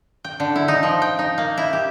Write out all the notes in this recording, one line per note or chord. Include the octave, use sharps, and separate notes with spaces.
G5
D3
E4
D#4
F3
G5
D#4
A#3
E4
G4